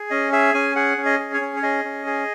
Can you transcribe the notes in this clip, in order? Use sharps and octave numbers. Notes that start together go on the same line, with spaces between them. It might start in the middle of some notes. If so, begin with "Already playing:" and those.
Already playing: G#4
C#4 D#5
G#4 E5
C#4 G#5
G#4 F#5
C#4
D#5
G#4
C#5
C#4
C#5
G#4 D#5
C#4
G#4